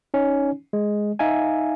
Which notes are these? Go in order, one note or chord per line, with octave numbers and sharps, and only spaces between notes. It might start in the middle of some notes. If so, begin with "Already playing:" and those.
C#4 D#4
G#3
D#4 E5 F5 G#5